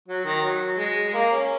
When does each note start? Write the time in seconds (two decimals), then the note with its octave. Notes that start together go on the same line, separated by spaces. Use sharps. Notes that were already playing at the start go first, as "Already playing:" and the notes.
0.08 F#3
0.25 D#3
0.43 F#3
0.78 G#3
1.08 G#3
1.14 A#3
1.31 C#4